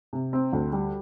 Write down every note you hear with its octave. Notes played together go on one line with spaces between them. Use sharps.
C3
C4
D2
G3